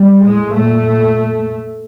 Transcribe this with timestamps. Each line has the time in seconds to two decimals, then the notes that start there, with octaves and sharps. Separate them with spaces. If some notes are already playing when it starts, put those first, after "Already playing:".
Already playing: G3
0.24 A2 G#3
0.54 A#2 A3
0.84 A#2